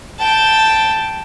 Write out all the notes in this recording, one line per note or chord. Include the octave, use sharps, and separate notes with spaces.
G5 A5